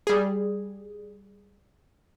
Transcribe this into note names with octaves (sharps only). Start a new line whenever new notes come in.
G3 G#4